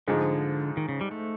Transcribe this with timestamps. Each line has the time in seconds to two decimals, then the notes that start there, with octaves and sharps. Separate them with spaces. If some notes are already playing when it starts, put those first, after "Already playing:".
0.07 G#2 D3 F3 G#3
0.77 D#3
0.89 C#3
1.01 G3
1.11 A3